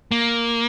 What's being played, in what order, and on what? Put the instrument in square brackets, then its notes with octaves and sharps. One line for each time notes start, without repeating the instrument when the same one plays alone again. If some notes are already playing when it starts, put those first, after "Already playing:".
[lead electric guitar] A#3